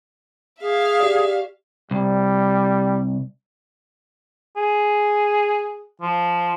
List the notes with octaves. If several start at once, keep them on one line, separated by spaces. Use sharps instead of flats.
G#4 E5 F5
G4 D5
C2 G3
G#4
F3